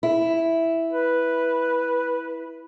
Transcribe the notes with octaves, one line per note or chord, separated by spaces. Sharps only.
E4
B4